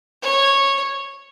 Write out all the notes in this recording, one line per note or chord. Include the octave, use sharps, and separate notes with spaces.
C#5